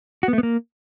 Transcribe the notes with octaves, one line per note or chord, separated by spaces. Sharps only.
F#4
B3
A3
B3
A#3